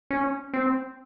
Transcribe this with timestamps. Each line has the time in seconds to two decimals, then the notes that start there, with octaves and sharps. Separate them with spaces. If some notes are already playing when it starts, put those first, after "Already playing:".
0.11 C#4
0.54 C4